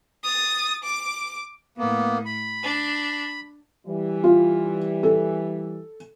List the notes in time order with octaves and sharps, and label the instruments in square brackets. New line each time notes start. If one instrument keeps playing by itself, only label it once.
[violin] D#6 A6
D6
[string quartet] A2 [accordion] A#3 B3
[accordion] B5
[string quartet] D4
[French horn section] E3 G3
[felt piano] F4
A4